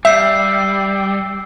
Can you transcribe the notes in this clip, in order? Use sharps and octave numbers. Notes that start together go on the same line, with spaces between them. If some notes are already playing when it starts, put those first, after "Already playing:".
G3 E5 E6 G6 C7